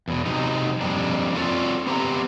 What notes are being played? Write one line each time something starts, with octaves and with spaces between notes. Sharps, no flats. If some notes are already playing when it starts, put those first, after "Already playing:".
E2 B2
C3 F#3 D#4
F2 G3 A#3 D4
C4 F4 F#4 A4 C#5 D5
B3 C4 G4 A#5